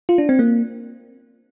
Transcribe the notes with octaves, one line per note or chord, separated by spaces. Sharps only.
F4
D4
C4
A#3